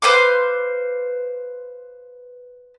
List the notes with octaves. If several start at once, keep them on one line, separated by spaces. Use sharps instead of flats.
B4 C5 F5 D6